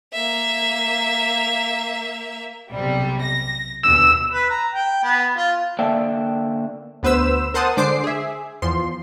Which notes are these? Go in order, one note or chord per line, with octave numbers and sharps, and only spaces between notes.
A#3 E5
B1 C3 G3
A#6
D#2 B2 D3 E6
B4
A#5
G5
B3
F4
D3 A#3 D5 E5 G5 A5
D2 B3 B4 C5 E6 E7
A#4 C5 F#5 A5 D#6
D3 G#3 C5 D6 C7
G#4 E5
E2 F3 C6